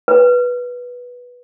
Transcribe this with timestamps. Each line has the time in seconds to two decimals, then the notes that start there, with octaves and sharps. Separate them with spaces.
0.08 B4